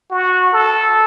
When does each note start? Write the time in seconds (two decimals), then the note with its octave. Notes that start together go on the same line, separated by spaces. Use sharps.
0.11 F#4
0.53 A4